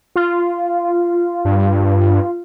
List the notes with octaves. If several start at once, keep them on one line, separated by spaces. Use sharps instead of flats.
F4
G2